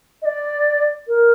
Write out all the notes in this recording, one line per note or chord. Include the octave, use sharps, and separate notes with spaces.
D#5
D5
A#4